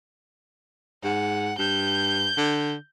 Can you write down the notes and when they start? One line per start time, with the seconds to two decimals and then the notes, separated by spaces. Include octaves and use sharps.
1.03 G#2 F#5
1.59 G2 G6
2.37 D3